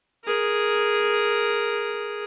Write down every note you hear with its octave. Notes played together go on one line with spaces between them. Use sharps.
G#4 A#4